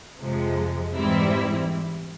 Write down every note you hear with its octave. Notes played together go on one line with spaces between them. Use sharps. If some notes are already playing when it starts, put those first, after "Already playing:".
F2 C3 F3 G#3
G#2 E3 G3 C4 E4